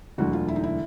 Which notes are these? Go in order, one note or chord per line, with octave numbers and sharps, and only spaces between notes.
E1 D2 D3 F#3 F#4
F4
E4
D#4
E4